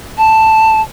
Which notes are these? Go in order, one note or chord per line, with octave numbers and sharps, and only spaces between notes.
A5